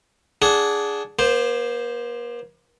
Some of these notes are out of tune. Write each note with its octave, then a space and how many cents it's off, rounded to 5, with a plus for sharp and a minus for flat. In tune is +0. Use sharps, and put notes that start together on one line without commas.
D4 -15 G#4 +0 F#5 +0
A#3 +40 C5 +0